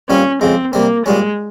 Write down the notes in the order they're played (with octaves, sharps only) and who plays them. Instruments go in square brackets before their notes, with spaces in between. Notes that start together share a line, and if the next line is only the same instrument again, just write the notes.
[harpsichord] A#2 G3 C4 F4 [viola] C#4
[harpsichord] F2 C#3 G#3 [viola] C4
[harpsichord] C3 G3 C4 [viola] A#3
[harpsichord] A#2 G3 C#4 [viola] G#3